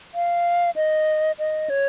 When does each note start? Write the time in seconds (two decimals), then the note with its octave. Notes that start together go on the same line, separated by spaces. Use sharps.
0.15 F5
0.76 D#5
1.39 D#5
1.70 C#5